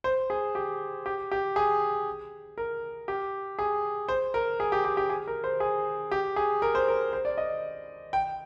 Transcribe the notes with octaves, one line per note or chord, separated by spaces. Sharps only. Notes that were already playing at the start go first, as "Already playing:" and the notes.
C5
G#4
G4
G4
G4
G#4
A#4
G4
G#4
C5
A#4
G#4
G4
G4
G4
G#4
A#4
C5
G#4
G4
G#4
A#4
C5
A#4
C5
D5
D#5
G5